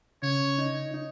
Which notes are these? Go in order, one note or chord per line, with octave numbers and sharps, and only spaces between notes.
C#3 C#5
D#4
D#4